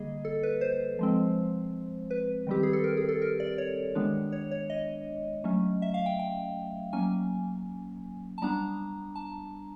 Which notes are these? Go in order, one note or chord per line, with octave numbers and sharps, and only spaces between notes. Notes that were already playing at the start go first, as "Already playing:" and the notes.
Already playing: D3 G3 A#3 G#4 D#5
A4
B4
C5
F3 G#3 C4
B4
D#3 G3 C4 G4
G#4
A4
A#4
G#4
A4
A#4
D5
C#5
D#3 G#3 B3 D4
C#5
C#5
D#5
F#3 A3 C#4
E5
F5
G5
G5
F#3 A#3 C#4 G#5
A5
G3 B3 D4 A#5
A5